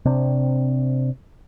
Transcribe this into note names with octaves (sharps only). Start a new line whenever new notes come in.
C3 C4 D4